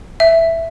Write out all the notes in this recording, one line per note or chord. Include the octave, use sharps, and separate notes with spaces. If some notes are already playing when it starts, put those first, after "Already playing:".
E5